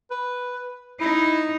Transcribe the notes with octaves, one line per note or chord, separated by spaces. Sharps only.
B4
D#4 E4